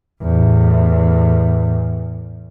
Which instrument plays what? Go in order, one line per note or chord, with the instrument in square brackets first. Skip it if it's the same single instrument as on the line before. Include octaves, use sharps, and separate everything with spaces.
[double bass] E2 A2